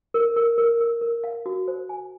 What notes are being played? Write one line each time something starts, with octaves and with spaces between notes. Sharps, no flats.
A#4
A#4
A#4
A#4
A#4
F5
F#4
C5
G#5